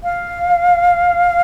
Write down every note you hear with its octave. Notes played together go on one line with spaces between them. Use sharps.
F5